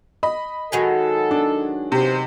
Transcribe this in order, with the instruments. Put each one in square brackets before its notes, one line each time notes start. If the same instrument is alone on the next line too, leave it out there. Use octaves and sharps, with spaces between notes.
[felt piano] D#5 [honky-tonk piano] B5
[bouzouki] D#3 F#3 G#3 [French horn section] A4
[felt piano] D4
[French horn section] E2 C5 [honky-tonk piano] C3